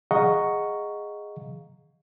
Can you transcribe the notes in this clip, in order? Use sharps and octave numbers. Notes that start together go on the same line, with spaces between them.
G#4 D#5 F5 F#5 A#5 C#6